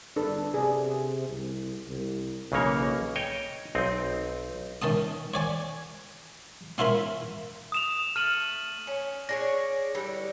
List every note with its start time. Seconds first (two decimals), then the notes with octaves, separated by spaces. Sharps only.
0.16 G1 D4 A4 B4
0.54 C3 G#4 D5
1.29 C2
1.89 C2
2.52 B1 C#3 E3 A#3 C#5
3.16 C#5 D#5 G5
3.75 B1 C4 D#4
4.82 D#3 C#4 A5 D#6
5.34 C#5 D5 G#5
6.78 C#4 E4 F4 A#4 B5
7.72 D#6 E7 F7
8.16 A3 F6 D#7 F#7
8.87 C#4
9.29 D4 G#4 C#5 A#6
9.95 D3 E3 G3